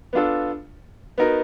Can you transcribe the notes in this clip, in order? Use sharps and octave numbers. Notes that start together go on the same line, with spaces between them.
B3 D4 F4 A4
B3 D#4 F#4 A#4